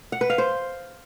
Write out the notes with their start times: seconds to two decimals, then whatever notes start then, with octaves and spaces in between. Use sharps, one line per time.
0.12 F#5
0.21 B4
0.30 F5
0.38 C5